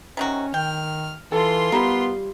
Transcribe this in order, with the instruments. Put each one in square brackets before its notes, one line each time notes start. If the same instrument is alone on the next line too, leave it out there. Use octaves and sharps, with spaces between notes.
[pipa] C3 D#3 F#4 [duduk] C#4
[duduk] D#3 [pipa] G5 [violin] F6
[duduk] E3 [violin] F4 C6 [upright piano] A4
[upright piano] G3 [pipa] A#3 E4 [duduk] B3